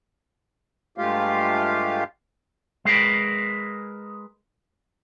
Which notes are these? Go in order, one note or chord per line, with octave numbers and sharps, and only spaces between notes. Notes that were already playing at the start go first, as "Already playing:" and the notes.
G2 G#3 A3 F4 G4 F5
G#3 G#4 A#4 B4